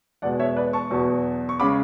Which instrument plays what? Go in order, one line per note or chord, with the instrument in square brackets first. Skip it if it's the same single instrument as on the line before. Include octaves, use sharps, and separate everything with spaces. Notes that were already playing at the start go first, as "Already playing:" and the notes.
[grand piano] E2 B2 G#3 D5 F#5
C#5 E5
B4 D5
A5 C#6
E2 B2 F#3
C#6
C#3 G#3 B5 D6